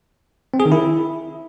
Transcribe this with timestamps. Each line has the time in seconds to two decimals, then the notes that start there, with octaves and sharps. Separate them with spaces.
0.54 C4
0.60 G#4
0.66 D#3
0.72 E4